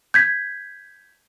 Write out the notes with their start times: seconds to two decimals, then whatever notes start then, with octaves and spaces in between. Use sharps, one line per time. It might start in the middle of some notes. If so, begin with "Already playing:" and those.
0.14 G6 G#6 B6